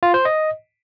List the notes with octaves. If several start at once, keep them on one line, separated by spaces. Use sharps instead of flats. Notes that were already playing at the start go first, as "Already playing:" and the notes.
F4
C5
D#5